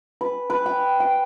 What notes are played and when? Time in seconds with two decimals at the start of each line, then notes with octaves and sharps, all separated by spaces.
0.21 B4
0.50 B4
0.66 G5
1.00 G5